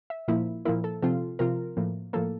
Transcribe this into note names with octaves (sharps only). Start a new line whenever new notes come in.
E5
A#2 F3 A#3 E4
A#2 F3 A#3 E4 A#4
A4
C3 F3 C4 F4 A4
C3 F3 C4 F4 A#4
A2 F3 A#3
A2 F3 A#3 A4